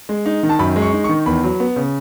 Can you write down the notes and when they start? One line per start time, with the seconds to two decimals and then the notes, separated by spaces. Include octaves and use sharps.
0.09 G#3
0.26 D#4
0.43 D#3
0.49 A5
0.59 F#2 B5
0.76 G#3
0.82 C#6
0.93 D#4
1.04 C#6
1.09 D#3
1.26 E2 B5
1.44 F#3
1.60 B3
1.76 C#3